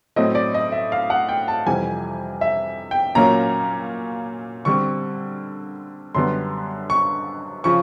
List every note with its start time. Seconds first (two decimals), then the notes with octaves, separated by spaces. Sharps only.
0.16 A2 F#3 A3 C4 D#5
0.35 D5
0.54 D#5
0.72 E5
0.92 F5
1.10 F#5
1.29 G5
1.48 A5
1.66 F2 C3 E3 G3 G#5
2.41 E5
2.91 G5
3.15 A#2 F#3 A#3 C#4 A#5
4.65 D3 G3 C4 C#6
6.15 F#2 D3 G3 B3 C6
6.90 C#6
7.64 C#3 F3 C#6